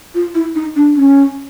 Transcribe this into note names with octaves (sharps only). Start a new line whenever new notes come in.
F4
E4
D#4
D4
C#4